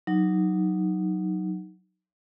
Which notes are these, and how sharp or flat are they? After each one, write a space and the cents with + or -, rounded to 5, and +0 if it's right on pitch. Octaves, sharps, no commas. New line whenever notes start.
F#3 +0 D#4 +0